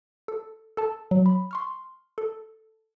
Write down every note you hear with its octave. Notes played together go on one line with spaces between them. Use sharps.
A4
A4 A5
F#3
B5
C6 C#6 F6
A4